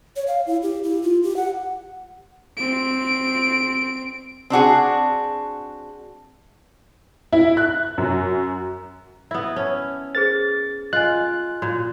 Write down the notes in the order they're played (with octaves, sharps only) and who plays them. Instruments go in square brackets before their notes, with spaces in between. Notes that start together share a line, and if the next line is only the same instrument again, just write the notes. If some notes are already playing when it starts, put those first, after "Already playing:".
[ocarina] C#5
F5
E4
G4
E4
F4
G4
F#5
[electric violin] C4 D7
[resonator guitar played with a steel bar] C4 D4 F#4 G#4
[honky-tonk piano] E4
F#6
F#2
[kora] B3 E4 [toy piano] E5 D#6
[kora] C#4 [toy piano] A5
[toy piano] G#4 B4 C5 [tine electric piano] A6
[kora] F4 [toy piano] D#5 G#5 [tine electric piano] F#6
[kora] A#2 [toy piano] F#4